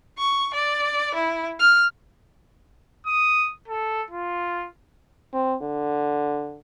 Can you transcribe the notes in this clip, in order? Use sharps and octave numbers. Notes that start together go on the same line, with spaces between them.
C#6
D5
E4
F6
D#6
A4
F4
C4
D3